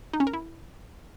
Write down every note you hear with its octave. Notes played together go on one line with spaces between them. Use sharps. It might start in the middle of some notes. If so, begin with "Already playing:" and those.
D#4
C#4
A#4
E4